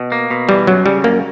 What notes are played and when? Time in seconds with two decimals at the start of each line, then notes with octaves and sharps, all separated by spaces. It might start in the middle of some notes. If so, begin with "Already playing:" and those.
Already playing: B2
0.12 A#3
0.30 B2
0.49 E3 G3
0.67 F#2 F#3
0.86 C#3 G3
1.04 F#2 A#3